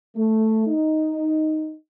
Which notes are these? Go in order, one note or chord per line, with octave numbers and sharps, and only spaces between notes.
A3
D#4